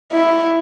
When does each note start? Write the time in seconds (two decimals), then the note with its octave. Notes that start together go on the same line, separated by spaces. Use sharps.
0.13 E4